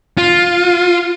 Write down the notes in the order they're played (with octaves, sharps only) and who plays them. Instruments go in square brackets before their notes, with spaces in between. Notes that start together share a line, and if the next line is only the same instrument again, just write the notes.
[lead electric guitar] F4